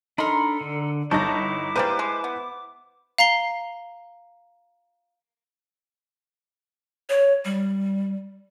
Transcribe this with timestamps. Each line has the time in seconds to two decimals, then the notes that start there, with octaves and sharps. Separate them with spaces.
0.18 D4 D#4 A4 A#4 B5 C6
0.61 D3
1.11 G1 D#4 E4 A4 C#6 D6 G6 A#6
1.76 G3 G#3 A#3 B4 C5
1.99 G#3
2.24 B3
3.18 F5 A#5 C7 G7
7.09 C#5
7.45 G3